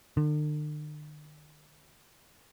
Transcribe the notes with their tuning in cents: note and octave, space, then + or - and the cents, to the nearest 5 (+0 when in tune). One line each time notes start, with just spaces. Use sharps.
D3 +45